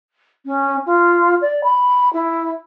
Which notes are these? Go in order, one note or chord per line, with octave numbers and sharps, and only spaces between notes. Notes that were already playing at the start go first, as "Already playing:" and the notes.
C#4
F4
D5
B5
E4